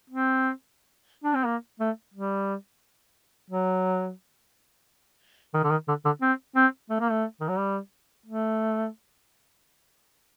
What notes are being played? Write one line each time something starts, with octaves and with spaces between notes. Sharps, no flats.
C4
D4
C4
A#3
A3
G3
F#3
D#3
D3
D#3
D3
D3
C4
C4
A3
A#3
A3
D#3
F#3
G3
A3